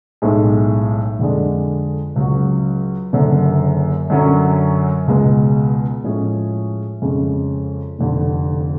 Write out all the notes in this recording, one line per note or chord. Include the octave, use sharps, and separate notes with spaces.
B1 A2 G#3
F2 D3 G#3 D4
C#2 C#3 F#3 C#4 F#4
F#1 F#2 D3
F#2 D3 F#3 C#4
C#2 B2 G#3 B3
A2 F3 G#3 C#4 G#4
F2 C#3 G#3 C#4
F1 F2 D3